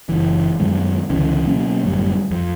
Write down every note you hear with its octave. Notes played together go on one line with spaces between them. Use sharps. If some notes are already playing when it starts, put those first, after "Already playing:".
F#1 E3
F#2 D#3 F#3 G#3
C#2 D3 E3 C#4
B2 F#3 A#3 C#4
G1 F#2 A2 G3
F2